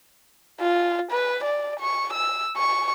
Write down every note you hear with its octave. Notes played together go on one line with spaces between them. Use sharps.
F4
B4
D5
C#6
E6
C#6